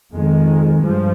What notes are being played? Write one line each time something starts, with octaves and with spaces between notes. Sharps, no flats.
F2 D#3 G#3
G2 F3